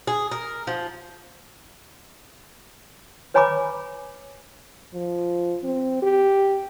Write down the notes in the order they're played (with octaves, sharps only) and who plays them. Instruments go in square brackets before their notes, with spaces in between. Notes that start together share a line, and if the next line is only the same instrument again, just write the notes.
[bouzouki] G#4
A#4
F3
[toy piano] B4 C#5 G#5 A#5 B5 D6
[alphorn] F3
C4
G4